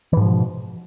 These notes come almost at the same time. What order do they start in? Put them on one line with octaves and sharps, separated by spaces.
E3 G#2 F3 B2